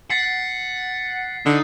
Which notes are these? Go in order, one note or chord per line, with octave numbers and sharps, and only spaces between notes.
F#5 A6 B6 C7
D3 D#4